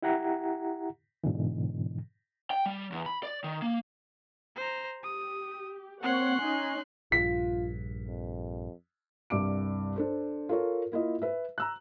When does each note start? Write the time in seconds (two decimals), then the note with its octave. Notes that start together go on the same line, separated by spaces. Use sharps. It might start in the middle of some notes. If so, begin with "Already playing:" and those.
0.02 E4 G4 F#5 A#5
1.24 G#2 B2 D3 E3
2.51 G5
2.66 G3
2.92 E2
3.06 B5
3.23 D5
3.44 D#3
3.62 A#3
4.56 C5 A#5
5.03 G4 D#6
6.03 A#3 C4 C#5 F#5 C6 F#6
6.39 C#4 D#4 G#5
7.12 A#1 G2 F4 B6
8.08 F2
9.30 C2 G2 D6 D7
9.96 D4 A4 C5
10.49 F4 A4 A#4 C#5
10.92 A#3 E4 F4 D#5
11.22 B4 E5
11.58 A#5 E6 F#6